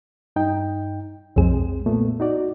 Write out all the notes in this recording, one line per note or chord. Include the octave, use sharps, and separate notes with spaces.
G2 D#4 G5
B1 F2 G#3 C4 G#4
A#2 A3 B3
D#4 F#4 D5